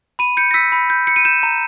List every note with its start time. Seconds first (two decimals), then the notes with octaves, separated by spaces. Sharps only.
0.19 B5 D#7
0.37 G6 C#7
0.51 A#6
0.54 E6 B6
0.72 B5
0.90 G6
1.07 G6 C#7
1.16 D#7
1.25 G6 E7
1.43 A#5